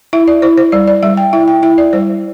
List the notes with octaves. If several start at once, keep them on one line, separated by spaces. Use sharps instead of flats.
E4 E5
D5
E4 C5
C5
G3 D5
D5
G3 E5
G5
E4 E5
G5
E4 E5
D5
G3 C5